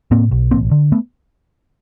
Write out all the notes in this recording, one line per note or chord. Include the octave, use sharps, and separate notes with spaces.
A2 A#3 C4
B1
A1 A#3 C4
D3
A3 B3